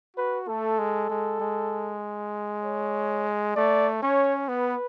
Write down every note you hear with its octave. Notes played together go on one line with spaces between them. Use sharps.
F#4 B4
A3 A4
G#3
G#3
G#3
C#5
A3 D5
C#4 C#5
B3 B4